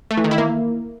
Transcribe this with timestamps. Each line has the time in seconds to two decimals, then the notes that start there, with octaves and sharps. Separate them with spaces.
0.11 A3
0.17 E3
0.24 D#3
0.31 E4
0.38 A#3